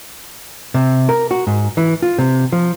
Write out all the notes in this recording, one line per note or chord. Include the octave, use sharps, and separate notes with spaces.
C3
A#4
F#4
G#2
E3
F4
C3
F3